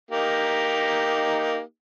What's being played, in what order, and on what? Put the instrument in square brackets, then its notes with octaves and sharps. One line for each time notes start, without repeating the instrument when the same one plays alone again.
[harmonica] A#3 D#4 G4